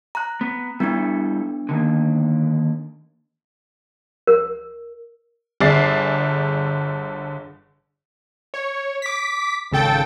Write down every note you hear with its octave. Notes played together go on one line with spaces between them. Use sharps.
A#5 F#6
B3
G3 B3 D4 E4 A4
D3 D#3 A#3
A#4
G1 D3 G#4 D5 A6 C7
C#5
D6 B6
G#1 C#3 A4 G5 A6